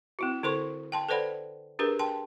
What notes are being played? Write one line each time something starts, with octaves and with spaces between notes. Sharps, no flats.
C4 E4 F#4
D3 E4 A4 C5 C6 C#6
G5 A5 C6
A4 B4 C5 D5 F#5 B5
D4 G4 G#4 A#4 B4
G5 A5 C6